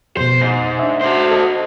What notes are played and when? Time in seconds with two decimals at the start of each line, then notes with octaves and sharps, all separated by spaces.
0.17 F2 B2 C5
0.41 G#2
0.79 D4 E5
1.01 F#4 C5
1.31 A4 D#5 A5